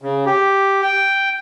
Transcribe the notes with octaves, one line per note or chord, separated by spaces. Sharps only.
C#3
G4
G5